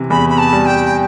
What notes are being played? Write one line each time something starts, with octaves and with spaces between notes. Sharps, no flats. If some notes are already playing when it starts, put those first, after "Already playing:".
Already playing: C3 E3
E2 B5
B5
A5
G3
G5